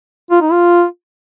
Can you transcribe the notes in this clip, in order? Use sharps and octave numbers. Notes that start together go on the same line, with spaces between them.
F4
D#4
F4